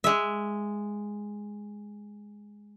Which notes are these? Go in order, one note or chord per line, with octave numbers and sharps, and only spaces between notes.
G#3 E5